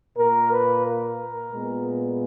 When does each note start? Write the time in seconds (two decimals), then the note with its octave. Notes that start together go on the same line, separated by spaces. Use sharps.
0.17 A#2 A#3 A#4
0.50 B4
0.84 A#4
1.52 A#2 G#3 B3